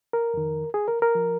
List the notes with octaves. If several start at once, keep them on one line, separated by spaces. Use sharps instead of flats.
A#4
F2 D#3
G#4
A#4
A#4
F3